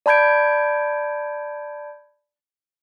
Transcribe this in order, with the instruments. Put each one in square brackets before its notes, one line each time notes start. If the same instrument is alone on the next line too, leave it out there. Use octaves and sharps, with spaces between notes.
[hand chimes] D5 A5 B5 G6 G#6 D7